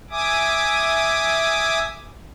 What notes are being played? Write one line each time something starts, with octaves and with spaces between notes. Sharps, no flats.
E5 G#5 D6 D#6